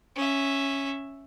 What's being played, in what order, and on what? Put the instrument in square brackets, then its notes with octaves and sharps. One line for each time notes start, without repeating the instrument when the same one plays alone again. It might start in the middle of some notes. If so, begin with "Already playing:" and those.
[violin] C#4 E5